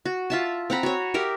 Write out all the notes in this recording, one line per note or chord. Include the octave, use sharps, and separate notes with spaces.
F#4
F4 E5 A5
C4 F#5 A#5 B5
F#4 C#5
G4 A#4 E5